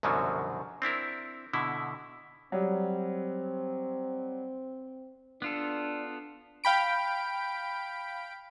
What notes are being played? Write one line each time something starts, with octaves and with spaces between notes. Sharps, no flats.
C2 F#2 B2 D3 F3 F#3
C4 D4 E4 A#4
B2 D3 E4
F#3 G3 C4
B3 D4 F4 A4
F5 G5 B5 D7